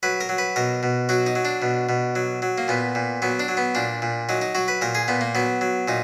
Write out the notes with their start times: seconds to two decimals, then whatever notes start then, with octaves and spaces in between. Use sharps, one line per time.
0.03 F#3 B4
0.21 A#4
0.29 F#3
0.38 B4
0.56 B2 A#4
0.83 B2
1.09 F#3 F#4
1.26 D#4
1.35 F#3
1.45 D4
1.62 B2
1.89 B2
2.15 F#3
2.42 F#3
2.58 A#3
2.68 A#2 B3
2.95 A#2
3.22 F#3 B3
3.39 D4
3.48 F#3
3.57 B3
3.75 A#2 D4
4.02 A#2
4.29 F#3 D#4
4.41 D#4
4.55 F#3 F#4
4.68 B4
4.81 A#2 A#4
4.95 G#4
5.08 A#2 B3
5.21 A#3
5.35 F#3 B3
5.61 F#3
5.88 A#2 D#4